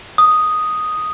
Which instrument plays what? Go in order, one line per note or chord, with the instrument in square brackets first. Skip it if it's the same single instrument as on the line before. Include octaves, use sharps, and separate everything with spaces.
[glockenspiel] D#6